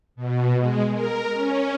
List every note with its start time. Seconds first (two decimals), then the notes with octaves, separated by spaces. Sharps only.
0.16 B2
0.59 G#3
0.93 A#4
1.34 C#4